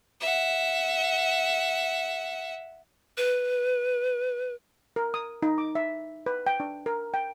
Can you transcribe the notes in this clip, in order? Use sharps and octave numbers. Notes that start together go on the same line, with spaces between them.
E5 F#5
B4
A#4
D#6
D#4
D6
E5
B4
G5
D4
A#4
G5